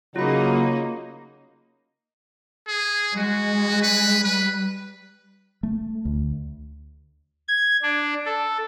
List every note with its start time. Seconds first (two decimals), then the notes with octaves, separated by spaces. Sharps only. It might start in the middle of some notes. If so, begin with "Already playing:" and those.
0.16 C#3 F#3 A#3 D#4 F4 B5
2.67 G#4
3.16 G#3 F#4
3.83 B4
4.24 G3 B4
5.63 A3
6.05 D2
7.48 G#6
7.83 D4
8.26 A4